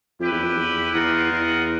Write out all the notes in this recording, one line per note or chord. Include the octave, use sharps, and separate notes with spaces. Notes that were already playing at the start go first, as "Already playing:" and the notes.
F2 E4 G4 B4
E2
F2
E2
E2 C4 F4 A#4 D#5 F#5
E2